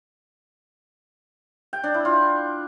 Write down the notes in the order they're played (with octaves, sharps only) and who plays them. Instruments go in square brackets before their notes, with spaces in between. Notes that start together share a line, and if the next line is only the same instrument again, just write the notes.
[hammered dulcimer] G5
D4
E4
F4